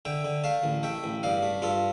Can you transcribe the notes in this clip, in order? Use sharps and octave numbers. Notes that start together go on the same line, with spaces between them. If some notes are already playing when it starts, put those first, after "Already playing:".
D3 E5 G5
D3
A3 F5 A5
A1
A3 E5 G5
A1
G2 D5 F5
A3
G2 F4 A4